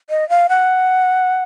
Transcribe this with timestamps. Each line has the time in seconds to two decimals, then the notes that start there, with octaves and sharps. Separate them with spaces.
0.10 D#5
0.29 F5
0.49 F#5